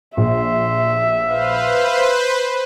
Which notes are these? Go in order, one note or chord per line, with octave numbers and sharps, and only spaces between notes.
A#1 E5 C6
B4 C5 F5